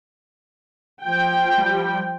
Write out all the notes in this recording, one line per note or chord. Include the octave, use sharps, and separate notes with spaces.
F3 G5
G3